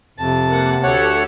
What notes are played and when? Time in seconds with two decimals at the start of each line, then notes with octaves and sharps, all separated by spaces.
0.18 F2 C3 A5
0.48 A#3 F#5
0.83 D2 G4 A4 C#5 F#5